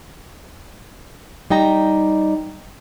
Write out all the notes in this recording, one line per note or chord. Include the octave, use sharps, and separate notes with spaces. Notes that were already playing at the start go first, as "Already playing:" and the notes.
G3 D#4 G5 A#5